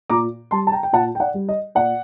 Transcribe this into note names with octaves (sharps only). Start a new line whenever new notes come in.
A#2 A#5 D6
G3 A5 C6
A5
G5 A#5
G5
A#2 F#5 A5
G5
D5 F#5
G3
D#5
A#2 D5 F#5